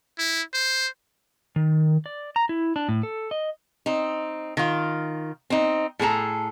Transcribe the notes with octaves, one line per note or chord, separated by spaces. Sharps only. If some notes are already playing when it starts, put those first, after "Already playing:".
E4
C5
D#3
D5
A#5
E4
D4
A2
A4
D#5
C4 D#4
D#3 F4
C4 D#4
A2 G#4 A4 A#5